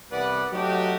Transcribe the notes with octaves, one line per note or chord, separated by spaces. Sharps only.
C2 E3 B3 B4 D5 F#5
F#3 A3 D#4 F#4 G4